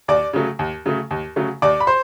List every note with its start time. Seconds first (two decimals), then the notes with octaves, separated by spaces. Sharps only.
0.08 D#2 D5 D6
0.33 C#3 F#3 A3
0.59 D#2
0.86 C#3 F#3 A3
1.11 D#2
1.36 C#3 F#3 A3
1.62 D#2 D5 D6
1.80 B5
1.87 C5 C6